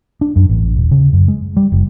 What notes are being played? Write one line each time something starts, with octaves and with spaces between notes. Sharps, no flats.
D4
F#2
A1
D#1
C#3
F#2
G#3
G3
F#1